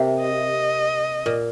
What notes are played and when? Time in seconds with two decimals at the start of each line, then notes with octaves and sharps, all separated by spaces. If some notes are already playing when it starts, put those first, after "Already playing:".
Already playing: C3 A#3 C4
0.21 D#5
1.26 A#2